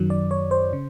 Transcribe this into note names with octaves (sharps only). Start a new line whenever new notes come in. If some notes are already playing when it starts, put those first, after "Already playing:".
Already playing: F#2 D#3 F#3
D5
C#5
C5
C#3